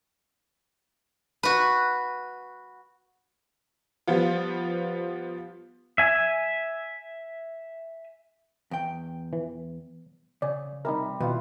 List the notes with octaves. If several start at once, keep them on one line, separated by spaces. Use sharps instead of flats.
F#4 B4
F3 G3 B3 F4
E5 G#5
E2 G5
E3
C#3 D5 G#5
C3 G3 D#4 A#4
B2 D#3 E4 F4 B4